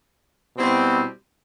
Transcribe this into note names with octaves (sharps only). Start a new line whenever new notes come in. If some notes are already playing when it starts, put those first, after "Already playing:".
B2 G3 C4 E4